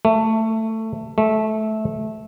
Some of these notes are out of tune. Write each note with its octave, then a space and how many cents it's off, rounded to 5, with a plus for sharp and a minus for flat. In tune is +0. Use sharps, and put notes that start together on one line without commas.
A3 +15
A3 -15